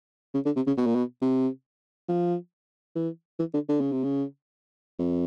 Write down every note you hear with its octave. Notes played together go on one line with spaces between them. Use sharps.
C#3
D3
C3
C#3
B2
A#2
B2
C3
F3
E3
E3
D3
D3
C#3
C3
C#3
F2